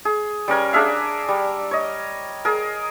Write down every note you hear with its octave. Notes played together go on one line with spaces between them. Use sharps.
G#4
G3 C#4 A#4 G#5
D4 G#4 E5 F5
G3
C#5 D#5
G#4 A#4